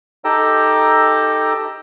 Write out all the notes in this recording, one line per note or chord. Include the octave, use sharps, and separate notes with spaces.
D#4 G4 A4 G5 A#5 E6